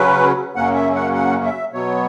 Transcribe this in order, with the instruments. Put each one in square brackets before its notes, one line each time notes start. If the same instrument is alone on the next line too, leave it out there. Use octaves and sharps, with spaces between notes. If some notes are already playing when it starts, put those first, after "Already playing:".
Already playing: [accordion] C#3 F#3 C#4 B4
F#2 C#3 F#3 A#3 C#4 F#5
E5
F#5
F#5
E5
B2 F#3 B3 C#5